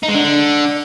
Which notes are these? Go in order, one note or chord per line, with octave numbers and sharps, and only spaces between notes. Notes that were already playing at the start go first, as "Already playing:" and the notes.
D#4
G#3
D3